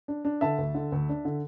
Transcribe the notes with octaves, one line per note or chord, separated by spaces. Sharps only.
D4
D4
D3 E5 A5
D2
D3
D2
D4
D3